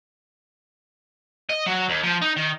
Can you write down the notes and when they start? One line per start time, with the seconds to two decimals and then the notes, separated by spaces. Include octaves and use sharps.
1.49 D#5
1.66 F#3
1.89 D#2
2.03 F3
2.22 D#4
2.36 D#3